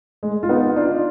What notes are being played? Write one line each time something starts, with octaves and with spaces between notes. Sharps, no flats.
G#3
F4
B3 D#4
D#4
D4 F4